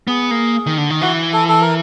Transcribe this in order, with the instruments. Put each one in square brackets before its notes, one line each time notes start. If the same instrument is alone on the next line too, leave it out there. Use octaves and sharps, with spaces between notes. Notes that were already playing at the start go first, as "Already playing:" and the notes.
[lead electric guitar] B3 [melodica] G#4
[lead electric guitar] A#3
D#3
D3
D#3
[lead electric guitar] E3 [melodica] F#4
[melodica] A4
A4
A#4